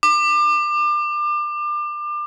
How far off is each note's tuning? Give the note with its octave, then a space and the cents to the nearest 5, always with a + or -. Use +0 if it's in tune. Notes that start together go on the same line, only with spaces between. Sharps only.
D6 +30